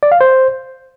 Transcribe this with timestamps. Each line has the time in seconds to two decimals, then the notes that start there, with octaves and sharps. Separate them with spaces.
0.03 D5
0.12 F5
0.21 C5